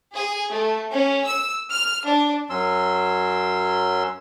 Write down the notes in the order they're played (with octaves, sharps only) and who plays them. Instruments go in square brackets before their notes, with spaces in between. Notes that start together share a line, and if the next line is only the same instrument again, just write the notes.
[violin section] G#4
A3
C#4
E6
F6
D4
[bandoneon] F#2 F#3 C#4 C6 E6